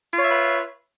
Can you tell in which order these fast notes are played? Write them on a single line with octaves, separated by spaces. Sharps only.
F4 C#5 E5 B4